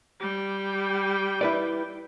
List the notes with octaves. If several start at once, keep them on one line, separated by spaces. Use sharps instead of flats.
G3 G5
E4 B4 D5